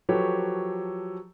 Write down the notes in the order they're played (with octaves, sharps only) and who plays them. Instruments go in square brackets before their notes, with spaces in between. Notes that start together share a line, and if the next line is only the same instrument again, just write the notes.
[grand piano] F3 F#3 G4 A4 B4 C#5